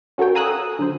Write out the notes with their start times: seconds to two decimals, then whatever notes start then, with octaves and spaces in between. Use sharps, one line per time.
0.18 C#4 F#4 A4 A#4 C#5 G5
0.35 F5 G#5 A#5 D#6 E6 F#6
0.48 A4
0.79 D3 F#3 C5